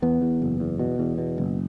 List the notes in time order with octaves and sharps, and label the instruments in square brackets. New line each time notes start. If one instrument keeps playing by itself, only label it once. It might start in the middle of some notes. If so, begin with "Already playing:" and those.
[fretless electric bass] E2 B3
E2
F#1
E2
B2
E2
B2
F#1